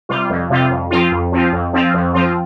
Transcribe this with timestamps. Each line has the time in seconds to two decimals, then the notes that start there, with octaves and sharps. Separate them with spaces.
0.09 C3 G3 F4
0.30 F2
0.50 C3 G3 F4
0.70 F2
0.91 F3 C4 F4
1.12 F2
1.32 F3 C4 F4
1.53 F2
1.73 F3 C4 F4
1.94 F2
2.13 F3 C4 F4